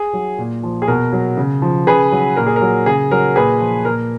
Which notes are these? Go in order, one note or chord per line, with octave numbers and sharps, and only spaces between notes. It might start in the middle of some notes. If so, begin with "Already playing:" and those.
Already playing: G#4
F#3
A#2
F3
G#4
B2 A#4
F#3
C#3
F3
C#3 G#4 B4
F#3
A#2 A#4
G#4
A#4
F#3
C#3 G#4
F#3 A#4
A#2 G#4 B4
F3
A#2 A#4